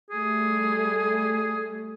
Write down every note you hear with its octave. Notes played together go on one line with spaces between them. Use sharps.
G3 A3 G#4